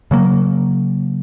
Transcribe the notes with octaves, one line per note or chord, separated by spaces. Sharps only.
C#3 F#3 A#3